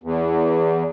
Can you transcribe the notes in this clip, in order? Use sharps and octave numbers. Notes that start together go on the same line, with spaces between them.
E2